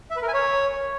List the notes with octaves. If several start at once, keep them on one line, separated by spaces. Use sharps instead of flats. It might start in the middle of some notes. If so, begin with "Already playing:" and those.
E5
B4
A#4
G#5
C#5